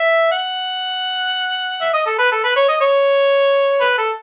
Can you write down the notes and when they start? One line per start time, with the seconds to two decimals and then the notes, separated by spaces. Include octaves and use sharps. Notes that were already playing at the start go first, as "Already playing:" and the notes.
Already playing: E5
0.32 F#5
1.81 E5
1.94 D#5
2.06 A4
2.19 B4
2.32 A4
2.44 B4
2.56 C#5
2.69 D#5
2.81 C#5
3.81 B4
3.98 A4